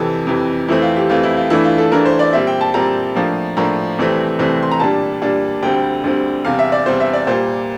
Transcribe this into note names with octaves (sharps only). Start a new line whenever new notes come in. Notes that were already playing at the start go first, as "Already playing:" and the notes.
Already playing: F2 C3 E3 A4
F2 C3 E3
F2 E3 A3 C4 E4
F4
G4
F2 E3 A3 C4 F4
E4
F4
G2 E3 A3 D4 E4
F4
A4
G2 E3 A3 D4 A#4
C5
D5
A#2 G3 C4 E5
G5
A5
A#2 G3 C4 A#5
A2 F3 A#3 D4
A2 F3 A#3 D4 A#5
C2 C3 E3 A3 C4
C2 C3 E3 A3 C4
C6
A#5
A#2 G3 D4 A5
A#2 G3 D4
D2 D3 G3 C4 G5
D2 D3 G3 C4
E2 C3 G3 F5
E5
D5
E2 C3 G3 C5
E5
D5
A#2 G3 A#3 C5